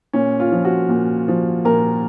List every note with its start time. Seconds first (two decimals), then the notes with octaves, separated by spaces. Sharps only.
0.13 A#2 C#4
0.40 F4
0.52 F3
0.65 F#4
0.89 A#2
1.28 F3
1.65 A#2 A#4